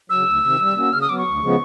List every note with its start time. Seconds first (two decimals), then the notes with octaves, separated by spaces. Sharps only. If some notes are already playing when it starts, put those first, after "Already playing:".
0.10 C#3 F#3 E6
0.26 D2
0.43 C3 D#3
0.60 G3
0.76 A#3 C#4 F#4
0.93 C#3 F6
1.01 D#6
1.09 F#3 B3 D6
1.18 C#6
1.26 D2
1.42 C#3 F3 G#3 B3